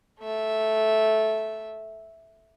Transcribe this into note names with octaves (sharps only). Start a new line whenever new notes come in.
A3 E5